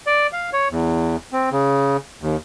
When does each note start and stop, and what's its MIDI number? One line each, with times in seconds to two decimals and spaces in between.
0.07 0.27 74
0.33 0.50 77
0.53 0.68 73
0.71 1.16 40
1.32 1.49 60
1.52 1.97 49
2.22 2.36 39